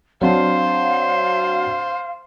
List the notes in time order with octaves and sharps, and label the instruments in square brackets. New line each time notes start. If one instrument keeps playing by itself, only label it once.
[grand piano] F#3 C4 D4 [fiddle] C5 [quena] F5